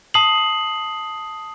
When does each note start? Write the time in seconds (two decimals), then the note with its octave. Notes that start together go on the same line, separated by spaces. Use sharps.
0.14 A5 D#6 C7 F#7